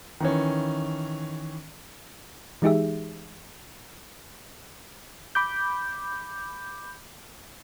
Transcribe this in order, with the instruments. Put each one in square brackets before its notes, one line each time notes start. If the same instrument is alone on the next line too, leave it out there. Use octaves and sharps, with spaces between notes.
[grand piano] D#3 E3 C#4
[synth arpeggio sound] E3 G#3 D#4 G4 G#4 E5
[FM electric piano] B5 D6 G6